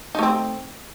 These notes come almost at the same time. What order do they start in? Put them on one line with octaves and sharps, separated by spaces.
D#4 A3 C4